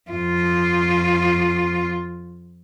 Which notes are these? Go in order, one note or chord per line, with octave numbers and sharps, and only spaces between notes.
F2 F4